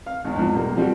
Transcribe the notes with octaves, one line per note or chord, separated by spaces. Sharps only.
F5
G#1 E2
E2 G#2 F3
B1 G3 A#3
F3 G3 C4 F#4